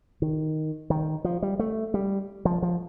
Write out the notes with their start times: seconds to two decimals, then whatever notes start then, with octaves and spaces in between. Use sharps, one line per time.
0.22 D#3
0.90 D#3
1.24 F3
1.42 G3
1.59 A3
1.94 G3
2.45 F3
2.62 F3